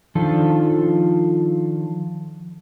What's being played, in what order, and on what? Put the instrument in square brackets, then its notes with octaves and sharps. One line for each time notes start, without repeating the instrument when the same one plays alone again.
[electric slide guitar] D#3 F3 D4 F4 A4